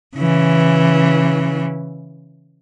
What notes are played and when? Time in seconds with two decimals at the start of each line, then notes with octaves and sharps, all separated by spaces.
0.17 C#3 E3